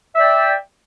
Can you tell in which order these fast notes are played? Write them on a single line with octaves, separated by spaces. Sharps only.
E5 D5 G5